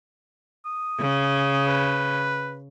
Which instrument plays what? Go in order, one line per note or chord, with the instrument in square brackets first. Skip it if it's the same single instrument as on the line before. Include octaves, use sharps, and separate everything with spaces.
[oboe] D#6
[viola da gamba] C#3
[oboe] B4